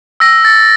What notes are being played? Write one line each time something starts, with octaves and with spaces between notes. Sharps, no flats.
E6 A#6
A6